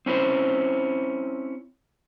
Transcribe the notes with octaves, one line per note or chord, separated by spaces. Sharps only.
C4 C#4 E4 C5